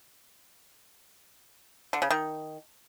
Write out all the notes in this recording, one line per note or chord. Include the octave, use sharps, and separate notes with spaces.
D3
C#3
D#3